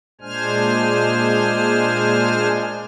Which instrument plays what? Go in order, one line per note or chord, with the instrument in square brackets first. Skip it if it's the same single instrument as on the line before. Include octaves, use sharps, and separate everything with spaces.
[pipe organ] A#2 G#3 D4 C5 G#5 F6